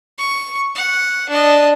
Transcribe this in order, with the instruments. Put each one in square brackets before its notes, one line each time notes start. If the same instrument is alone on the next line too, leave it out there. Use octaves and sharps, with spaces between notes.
[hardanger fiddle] C#6
F#5
D4 D#5